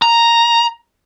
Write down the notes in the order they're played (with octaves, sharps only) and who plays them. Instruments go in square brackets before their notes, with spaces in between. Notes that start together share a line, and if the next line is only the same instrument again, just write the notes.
[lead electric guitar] A#5